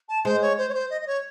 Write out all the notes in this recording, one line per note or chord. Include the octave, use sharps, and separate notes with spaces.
A5
G#3 C5
C#5
C5
C#5
C5
D#5
D#5
C#5